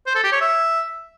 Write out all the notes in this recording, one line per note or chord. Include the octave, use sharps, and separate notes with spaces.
C5
A4
G4
C#5
E5